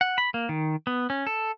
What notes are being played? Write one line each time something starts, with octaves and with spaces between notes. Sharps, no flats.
F#5
B5
A#3
D#3
B3
C#4
A4